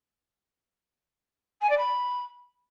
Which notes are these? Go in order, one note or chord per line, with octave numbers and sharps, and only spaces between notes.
G#5
D5
B5